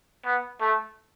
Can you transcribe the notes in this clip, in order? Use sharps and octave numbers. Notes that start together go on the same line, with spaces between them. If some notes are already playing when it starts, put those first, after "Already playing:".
B3
A3